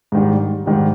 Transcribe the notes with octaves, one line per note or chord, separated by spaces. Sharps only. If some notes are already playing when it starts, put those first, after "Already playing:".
G#2 D#3 G3
G#2 D#3 G3